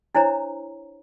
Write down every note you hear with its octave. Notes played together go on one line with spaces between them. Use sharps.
D4 E4 C5 C#5 A#5